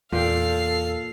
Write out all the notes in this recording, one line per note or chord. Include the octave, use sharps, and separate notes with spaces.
E2 A#2 A4 F5 G5 C7